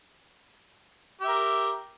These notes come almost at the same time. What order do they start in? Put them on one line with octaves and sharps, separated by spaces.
G4 E5 A#4